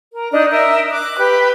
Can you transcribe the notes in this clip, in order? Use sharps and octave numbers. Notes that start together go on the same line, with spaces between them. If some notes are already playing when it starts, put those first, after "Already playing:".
A#4
D4 D#4 D#5
A#4 D#5 E5
D6 F#6
G4 B4